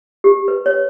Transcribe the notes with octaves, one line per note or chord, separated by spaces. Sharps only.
G4
B4
C#5